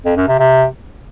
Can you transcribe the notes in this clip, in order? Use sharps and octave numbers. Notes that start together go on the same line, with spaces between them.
F2
F#2
C3
C3